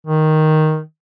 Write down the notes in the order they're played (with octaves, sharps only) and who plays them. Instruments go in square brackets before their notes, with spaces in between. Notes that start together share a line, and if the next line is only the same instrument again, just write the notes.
[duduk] D#3